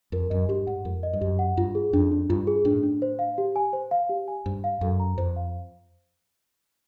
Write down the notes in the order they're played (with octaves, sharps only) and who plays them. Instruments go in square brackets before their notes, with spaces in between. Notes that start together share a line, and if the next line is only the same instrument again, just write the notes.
[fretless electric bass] F2 [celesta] A#4
[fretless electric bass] F#2 [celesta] D#5
[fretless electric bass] G2 [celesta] G4
[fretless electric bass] G#2 [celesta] F#5
[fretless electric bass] F2 [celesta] A#4
[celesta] D#5
[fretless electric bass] G2
[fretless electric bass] F#2 [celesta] G4
[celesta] F#5
[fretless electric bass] G2 [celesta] F4
[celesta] G#4
[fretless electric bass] F2 [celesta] D4
[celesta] D4
[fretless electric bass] G2 [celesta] F4
[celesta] G#4
[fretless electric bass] A2 [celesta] D4
[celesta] D4
C5
F5
G4
G#5
C5
F5
G4
G#5
[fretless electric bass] G2 [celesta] C5
[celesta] F5
[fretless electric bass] F#2 [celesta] A4
[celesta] A#5
[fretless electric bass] F2 [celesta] C5
[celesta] F5